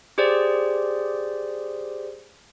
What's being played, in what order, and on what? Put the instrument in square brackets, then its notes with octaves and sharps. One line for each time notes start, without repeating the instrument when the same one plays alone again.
[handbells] G4 G#4 C5 D5